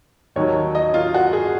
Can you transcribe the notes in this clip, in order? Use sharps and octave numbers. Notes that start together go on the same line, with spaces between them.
D#2 D#3 F#3 C#5
D#5
F4
F#4
G#4